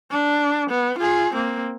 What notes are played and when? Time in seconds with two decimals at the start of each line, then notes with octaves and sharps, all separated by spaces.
0.11 D4
0.70 B3
0.99 F4 G#4
1.34 A#3 C4